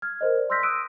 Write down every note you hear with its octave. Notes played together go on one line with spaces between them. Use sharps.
F6 G#6
A#4 C5 D#5
D5
C6 E6 F6 G6 A#6 B6
D#6 E6 F#6 D7 D#7